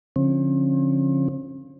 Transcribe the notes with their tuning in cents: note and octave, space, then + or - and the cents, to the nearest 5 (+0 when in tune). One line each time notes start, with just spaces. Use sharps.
D3 -40 F3 +0 C4 +45